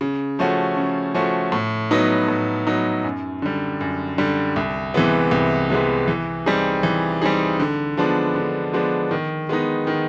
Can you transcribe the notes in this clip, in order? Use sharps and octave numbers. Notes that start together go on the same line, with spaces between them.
C#3
F3 A3 C#4 F#4
C#3
F3 A3 C#4 F#4
A2
F#3 B3 D#4
A2
F#3 B3 D#4
F#2
D3 G3
F#2
D3 G3
C2
C3 E3 G#3 B3
C2
C3 E3 G#3 B3
E3
G3 C4 D#4 G#4
E3
G3 C4 D#4 G#4
D3
F3 G#3 B3 D4
D3
F3 G#3 B3 D4
D#3
G#3 B3 D#4
D#3